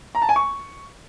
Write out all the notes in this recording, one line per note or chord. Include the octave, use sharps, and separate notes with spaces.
A#5
A5
G#5
C#6